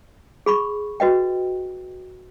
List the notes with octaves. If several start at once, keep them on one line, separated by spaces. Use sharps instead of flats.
G#4 B5 C#6
F#4 B4 D#5 G5